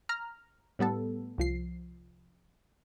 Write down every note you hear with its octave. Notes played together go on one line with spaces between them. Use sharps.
A#5 F6
A2 G3 B3 A4
C2 F3 C7